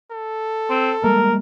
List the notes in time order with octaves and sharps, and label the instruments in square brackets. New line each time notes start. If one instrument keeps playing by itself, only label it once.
[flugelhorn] A4
[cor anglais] C4
[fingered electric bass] G3 G#3 A#3 [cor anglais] A#4